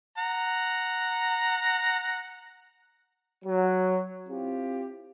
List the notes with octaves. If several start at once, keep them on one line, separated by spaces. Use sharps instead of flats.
F#5 A#5
F#3
C4 E4 F4 G4